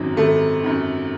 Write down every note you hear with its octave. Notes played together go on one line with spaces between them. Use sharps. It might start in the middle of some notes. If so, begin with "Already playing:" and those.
Already playing: G#1 F#2 D#3 F#3
G#1 A3
F#2 D#3